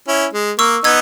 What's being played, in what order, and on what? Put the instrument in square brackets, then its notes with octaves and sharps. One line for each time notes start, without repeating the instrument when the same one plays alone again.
[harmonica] C#4 E4
G#3
[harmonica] A#3 [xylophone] C#6 E6
[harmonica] B3 D#4 [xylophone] E6 G#6